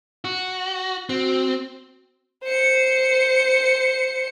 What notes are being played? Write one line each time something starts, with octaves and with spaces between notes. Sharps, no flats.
F#4
C4 F#4
C5 C#7